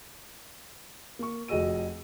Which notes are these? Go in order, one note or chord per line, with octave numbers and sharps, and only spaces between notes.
A#3 C#6
F1 F#4 G#4 D#5 E6 D#7